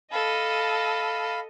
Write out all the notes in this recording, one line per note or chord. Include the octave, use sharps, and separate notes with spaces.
A4 D#5 F5 B5